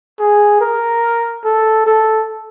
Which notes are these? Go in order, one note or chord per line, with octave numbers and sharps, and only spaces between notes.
G#4
A#4
A4
A4